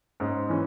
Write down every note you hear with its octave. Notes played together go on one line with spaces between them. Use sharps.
G#2 G#3 C#4
E3 C#4